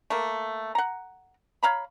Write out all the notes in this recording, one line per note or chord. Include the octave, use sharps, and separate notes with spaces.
A3 A#3
F#5 A#5
C#5 F5 A#5 B5